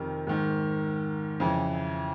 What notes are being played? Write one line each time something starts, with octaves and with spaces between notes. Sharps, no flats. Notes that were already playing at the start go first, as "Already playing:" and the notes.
Already playing: F2 C3 D#3 A#4
G#2 D#3
F2 C#3 E3